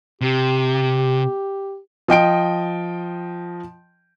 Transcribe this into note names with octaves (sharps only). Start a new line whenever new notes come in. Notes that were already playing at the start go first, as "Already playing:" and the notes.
C3 G4
F3 D#5 G5 D7